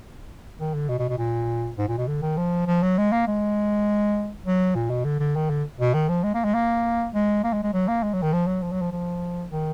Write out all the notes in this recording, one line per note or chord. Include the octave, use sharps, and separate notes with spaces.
D#3
D3
B2
B2
B2
A#2
G#2
A#2
B2
D3
D#3
F3
F3
F#3
G#3
A#3
G#3
F#3
A#2
B2
D3
D3
D#3
D3
B2
D#3
F3
G#3
A#3
G#3
A#3
G#3
A#3
G#3
G#3
F#3
A#3
G#3
F#3
D#3
F3
F#3
F3
F#3
F3
F3
D#3